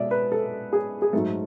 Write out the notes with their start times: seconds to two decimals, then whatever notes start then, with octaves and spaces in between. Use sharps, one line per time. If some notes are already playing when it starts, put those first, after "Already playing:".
Already playing: B2 G#3 D5 E5
0.11 B4
0.32 A4
0.73 G#4
1.02 G#4
1.13 G#2 F#3 A3 A4